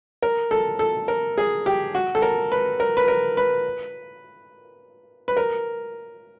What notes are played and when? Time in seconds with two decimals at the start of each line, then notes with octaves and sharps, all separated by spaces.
0.22 A#4
0.51 A4
0.79 A4
1.08 A#4
1.38 G#4
1.66 G4
1.95 F#4
2.15 A4
2.22 A#4
2.52 B4
2.80 A#4
2.97 B4
3.08 A#4
3.37 B4
5.28 B4
5.37 A#4